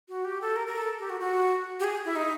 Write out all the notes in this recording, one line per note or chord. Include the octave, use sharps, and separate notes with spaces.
F#4
G4
A4
A#4
A#4
A4
G4
F#4
F#4
G4
G#4
E4
D#4